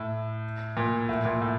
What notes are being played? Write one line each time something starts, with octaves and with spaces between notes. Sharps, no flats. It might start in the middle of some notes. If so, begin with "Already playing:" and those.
Already playing: A2
A#2
A2
A#2
A2